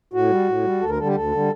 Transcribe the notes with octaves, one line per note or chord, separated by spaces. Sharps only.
A2 F#4
G3
A2
G3
D2 A4
A#4
D3 G3 A4
G4
D2 A4
D3 G3